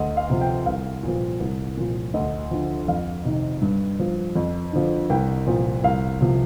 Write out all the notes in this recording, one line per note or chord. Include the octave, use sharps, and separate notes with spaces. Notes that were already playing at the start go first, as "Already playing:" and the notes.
Already playing: D2 D#5
F5
C3 F3
G5
C2 F5
A#2 F3
C2
A#2 F3
D2 D#5
D3 F3
F2 F5
C3 D#3
G2
F3
F2
D3 F3
C2 G5
A#2 F3
C2 F5
C3 F3